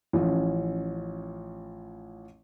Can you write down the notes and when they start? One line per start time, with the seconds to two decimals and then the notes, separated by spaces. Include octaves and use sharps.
0.13 A1 F3 C#4